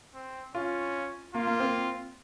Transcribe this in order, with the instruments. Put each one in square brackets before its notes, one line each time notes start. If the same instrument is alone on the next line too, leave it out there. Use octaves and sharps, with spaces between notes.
[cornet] C4
[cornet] C#4 [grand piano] F4
[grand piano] A#3 [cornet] F4
[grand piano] A#3
C4